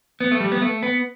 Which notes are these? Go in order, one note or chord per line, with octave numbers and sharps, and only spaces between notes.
B3
A3
G3
B3
A3
B3